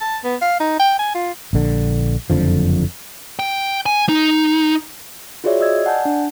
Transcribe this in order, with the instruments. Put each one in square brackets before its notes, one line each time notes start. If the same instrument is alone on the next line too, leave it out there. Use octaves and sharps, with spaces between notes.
[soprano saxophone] A5
B3
F5
D#4
G5
G#5
F4
[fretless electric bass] A#1 D3
F#1 F2 D3 F3
[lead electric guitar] G5
G#5
D#4
[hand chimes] F4 F#4 G#4 C#5 D5 E5
D#5 E6 G#6
D5 F#5 G#5 A5 G6
D4